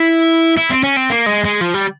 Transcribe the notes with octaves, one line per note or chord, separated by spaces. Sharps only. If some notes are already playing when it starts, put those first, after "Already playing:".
Already playing: E4
E4
C4
C#4
C4
A#3
G#3
G#3
F3
G3